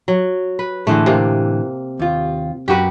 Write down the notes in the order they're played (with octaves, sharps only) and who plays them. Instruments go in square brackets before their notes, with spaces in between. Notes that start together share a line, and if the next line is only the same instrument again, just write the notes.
[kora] F#3
B4
[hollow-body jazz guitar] A2 D3 E3 [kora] G#3 A3
[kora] C3 A#3
[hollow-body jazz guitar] D#2 F4
[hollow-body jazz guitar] F#2 F#4 [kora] G4 B4